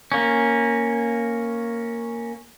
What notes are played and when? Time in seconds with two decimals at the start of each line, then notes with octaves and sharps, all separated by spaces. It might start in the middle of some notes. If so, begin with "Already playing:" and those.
0.12 A#3 C#4